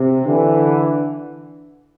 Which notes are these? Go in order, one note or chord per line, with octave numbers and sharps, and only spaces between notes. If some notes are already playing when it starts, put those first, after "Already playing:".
Already playing: C3
D3 E3